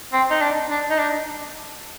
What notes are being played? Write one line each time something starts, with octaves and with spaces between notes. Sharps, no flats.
C4
D#4
D4
D4
D#4
D4